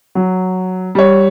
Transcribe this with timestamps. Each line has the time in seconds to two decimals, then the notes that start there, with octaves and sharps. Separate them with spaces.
0.15 F#3
0.95 G3 C#5